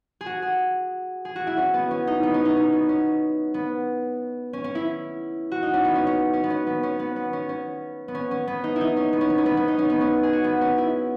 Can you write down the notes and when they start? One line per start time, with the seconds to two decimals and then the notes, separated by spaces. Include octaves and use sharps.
0.21 G#4
0.26 F#4
0.42 G#4
1.25 G#4
1.36 F#4
1.47 E4
1.58 C#4
1.74 B3
1.91 C#4
2.07 D#4
2.23 B3
2.34 C#4
2.45 D#4
2.57 C#4
2.73 B3
2.89 C#4
3.54 B3
4.53 C#4
4.64 C#4
4.75 E4
5.52 F#4
5.63 D#4
5.74 C#4
5.85 B3
5.95 C#4
6.07 C#4
6.33 C#4
6.44 B3
6.50 C#4
6.67 B3
6.83 C#4
6.99 B3
7.16 B3
7.33 C#4
7.49 C#4
8.08 B3
8.15 C#4
8.31 C#4
8.48 B3
8.64 D#4
8.76 D#4 E4
8.97 C#4
9.13 B3
9.21 C#4
9.30 B3
9.38 C#4
9.46 B3
9.57 B3
9.68 D#4
9.79 C#4
9.90 B3
10.01 C#4
10.23 G#4
10.33 F#4
10.44 B3
10.61 C#4
10.78 E4